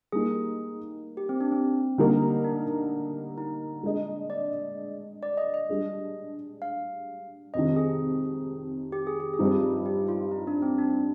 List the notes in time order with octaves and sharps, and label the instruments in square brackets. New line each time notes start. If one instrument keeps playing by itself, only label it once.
[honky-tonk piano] G3 A#3 D#4 [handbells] G#4
[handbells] G4
C4
D4
C4
[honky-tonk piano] D3 G3 A#3 D#4 A#4
[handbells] D4
D#4
[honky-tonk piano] G#3 D4 G#4 D#5
[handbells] D5
D5
D#5
D#5
[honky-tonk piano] G3 D4 G#4
[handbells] F5
[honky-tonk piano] F2 C3 D#3 [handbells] D#5
[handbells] G#4
G4
G#4
G4
G#4
[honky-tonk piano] G2 F3 C4 D#4
[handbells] G4
G4
F4
D#4
D4
C4
D4